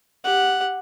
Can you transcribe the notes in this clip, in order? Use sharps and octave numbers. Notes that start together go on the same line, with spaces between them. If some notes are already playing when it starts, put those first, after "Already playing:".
G4 F#5